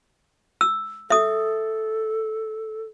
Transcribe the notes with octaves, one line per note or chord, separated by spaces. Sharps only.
E6
A4 E5 D#6